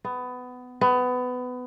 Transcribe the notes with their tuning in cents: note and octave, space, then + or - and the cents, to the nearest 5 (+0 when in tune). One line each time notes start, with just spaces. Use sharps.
B3 +20
B3 +20